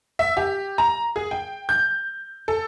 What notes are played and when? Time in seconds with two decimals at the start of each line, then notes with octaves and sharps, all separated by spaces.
0.19 E5
0.37 G4
0.78 A#5
1.16 G#4
1.31 G5
1.69 G6
2.48 A4